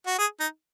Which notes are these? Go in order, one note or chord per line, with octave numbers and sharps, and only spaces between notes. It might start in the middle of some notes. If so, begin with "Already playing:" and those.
F#4
G#4
D#4